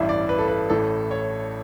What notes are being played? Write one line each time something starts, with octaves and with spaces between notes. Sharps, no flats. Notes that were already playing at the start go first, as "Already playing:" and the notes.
Already playing: A1 G2 E3 E5
D5
B4
A4
B4
A1 A2 E3 A4
C#5